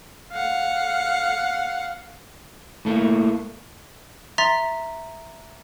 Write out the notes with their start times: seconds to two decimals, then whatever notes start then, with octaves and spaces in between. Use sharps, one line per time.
0.32 F5 F#5
2.85 A2 A3 A#3
4.38 E5 A#5 C6 A6 B6